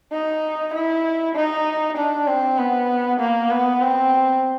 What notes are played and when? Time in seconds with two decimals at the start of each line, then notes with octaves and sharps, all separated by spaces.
0.12 D#4
0.74 E4
1.35 D#4
1.97 D4
2.28 C4
2.58 B3
3.20 A#3
3.51 B3
3.82 C4